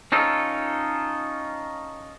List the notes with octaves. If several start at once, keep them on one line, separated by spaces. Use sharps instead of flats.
C#4 D#4 F4 A4